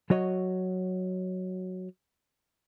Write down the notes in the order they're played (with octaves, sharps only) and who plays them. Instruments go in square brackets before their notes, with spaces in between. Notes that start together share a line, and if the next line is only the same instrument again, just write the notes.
[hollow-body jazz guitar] F#3 F#4 C#5 D#5